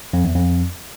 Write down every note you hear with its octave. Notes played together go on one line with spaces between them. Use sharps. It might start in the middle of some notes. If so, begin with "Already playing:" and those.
F2
E2
F2